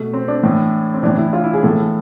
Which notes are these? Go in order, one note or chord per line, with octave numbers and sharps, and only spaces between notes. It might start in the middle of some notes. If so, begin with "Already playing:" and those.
Already playing: B2 A3
C4
D4
A2 E3
C4
A2 E3 D4
E4
F4
E4
G#4
A2 E3 A4